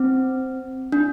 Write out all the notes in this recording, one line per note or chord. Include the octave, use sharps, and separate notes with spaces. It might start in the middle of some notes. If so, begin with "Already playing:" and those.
Already playing: C4
D4